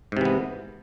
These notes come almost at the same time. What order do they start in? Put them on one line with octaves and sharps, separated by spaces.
G#2 C3 E3 B3